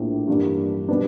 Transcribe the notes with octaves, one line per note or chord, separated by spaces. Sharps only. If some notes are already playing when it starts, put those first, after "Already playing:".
Already playing: A#1 A2 F3 A#3
G2 E3 G3 A#3 D4
B2 G3 B3 D4